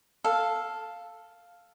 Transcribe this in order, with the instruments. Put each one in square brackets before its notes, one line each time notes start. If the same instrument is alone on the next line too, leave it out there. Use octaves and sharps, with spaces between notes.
[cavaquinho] A4 F5